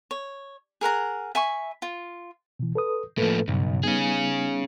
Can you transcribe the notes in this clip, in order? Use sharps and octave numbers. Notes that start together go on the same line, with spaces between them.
C#5
G#4 A#4 F#5 A#5
E5 G#5 B5 C#6
F4
B2 E3
A4 B4 D#6
A2 F3 A#3 A4 B4
B1 G2 C#3
G3 B3 C#4 D#4 G#4